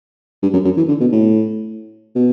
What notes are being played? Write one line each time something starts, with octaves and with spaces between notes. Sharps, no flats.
G2
F#2
F#2
E3
D3
B2
A2
B2